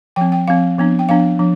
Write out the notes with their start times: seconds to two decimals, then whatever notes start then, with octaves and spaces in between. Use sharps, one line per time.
0.16 F3 C4 G5
0.32 G5
0.48 F3 C4 F5
0.78 F3 B3 D4
0.99 G5
1.09 F3 B3 D4 F5
1.39 F3 D4